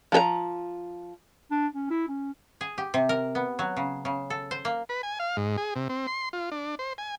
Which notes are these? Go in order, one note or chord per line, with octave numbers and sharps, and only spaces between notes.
F3 A4 A#5
D4
C#4
E4
C#4
G#4
G4
C3
A#4
B3
F#3
C#3
C#3
A4
C5
A#3
B4
G#5
F5
G#2
G#4
C3
C4
C6
F4
D4
C5
G#5